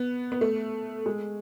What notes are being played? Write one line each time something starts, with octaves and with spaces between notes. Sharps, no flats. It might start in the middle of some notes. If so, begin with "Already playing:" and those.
Already playing: B3
B3
A3
G#3